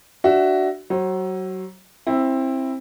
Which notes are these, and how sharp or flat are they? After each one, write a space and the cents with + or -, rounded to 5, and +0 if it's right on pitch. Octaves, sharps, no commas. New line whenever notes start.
D4 +15 F#4 +20 E5 +5
F#3 +25 C#5 -45
C4 +20 E4 +0